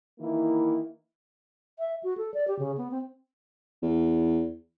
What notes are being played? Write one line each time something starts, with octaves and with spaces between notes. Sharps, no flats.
D#3 E3 A#3 E4
E5
F#4
A4
D5
G4
C#3
B3
C4
E2